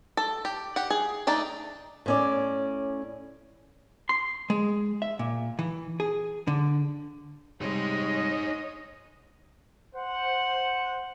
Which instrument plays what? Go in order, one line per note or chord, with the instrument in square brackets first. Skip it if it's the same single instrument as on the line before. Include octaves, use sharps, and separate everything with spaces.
[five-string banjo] A4
G4
G4 F#5
G#4
A3 D4 D#4 A4
[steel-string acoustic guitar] A2 C#4 D5
[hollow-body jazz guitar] C6
G#3
E5
A#2
E3
G#4
D3
[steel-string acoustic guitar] C3 G3 G#3 [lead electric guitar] D#4 C5 [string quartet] C#5 D#5
[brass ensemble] C5 F#5